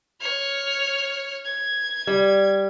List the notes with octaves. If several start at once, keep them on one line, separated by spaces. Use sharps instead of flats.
C#5 F6
G#6
G3